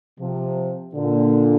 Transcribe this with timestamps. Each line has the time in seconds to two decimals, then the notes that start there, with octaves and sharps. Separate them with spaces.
0.19 C3 F3
0.95 A#2 D3